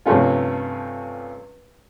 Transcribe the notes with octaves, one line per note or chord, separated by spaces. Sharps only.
G2 C3 F3 A3 C#4 F4